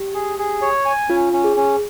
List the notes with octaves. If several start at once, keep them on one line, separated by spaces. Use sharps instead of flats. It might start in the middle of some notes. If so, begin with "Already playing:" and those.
Already playing: G4
G#4
G#4
C#5
G#5
C#4 F4
C#4
G#4
C#4